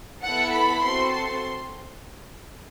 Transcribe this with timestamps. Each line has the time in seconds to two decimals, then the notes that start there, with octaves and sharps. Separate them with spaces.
0.24 B3 E4 A4 F#5
0.54 B5
0.83 A3 C4 F#4 A4 C6
1.13 C6